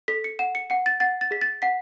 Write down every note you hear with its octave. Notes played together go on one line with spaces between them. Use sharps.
A4 B6
C#7
F#5 E7
C#7
F#5 C#7
A6
F#5 A6
A6
G#4 B6
A6
F#5 B6